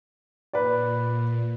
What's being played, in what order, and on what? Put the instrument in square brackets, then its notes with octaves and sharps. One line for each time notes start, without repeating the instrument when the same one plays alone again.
[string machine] A#2 [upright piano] B4 D5